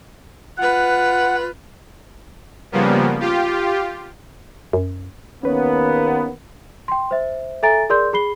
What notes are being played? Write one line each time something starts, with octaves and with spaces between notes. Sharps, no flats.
F4 B4 F#5
C#3 F3 G3 A#3 B3
F4 G4
F#2
D#2 A#3 B3 C#4 B4 C#5
G5 C6
C5 E5
A4 E5 G#5 A#5 A6 D7
G#4 A#4 D5 C6 G6
G#4 B5 C7 G7